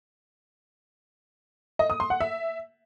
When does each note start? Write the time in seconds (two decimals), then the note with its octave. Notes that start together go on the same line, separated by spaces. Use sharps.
1.79 D#5
1.90 D#6
2.00 C6
2.10 F#5
2.20 E5